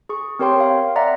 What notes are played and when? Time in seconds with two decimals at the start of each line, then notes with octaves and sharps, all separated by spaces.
0.09 G#4 C#6
0.39 C4 G4 A#4 C#5 G5 C6
0.60 F5
0.96 D5 E5 F#5 A#5